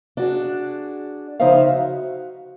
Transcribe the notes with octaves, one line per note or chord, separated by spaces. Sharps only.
D4 F#4 G#4
C#3 F3 D#4 C5 E5 F5
F#4